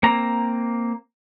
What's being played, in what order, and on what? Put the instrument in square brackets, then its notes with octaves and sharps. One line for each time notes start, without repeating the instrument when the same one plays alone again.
[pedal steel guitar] A#3 C4 A#5